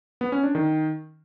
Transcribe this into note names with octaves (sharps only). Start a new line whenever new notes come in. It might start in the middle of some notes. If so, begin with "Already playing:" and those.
B3
C#4
D4
D#3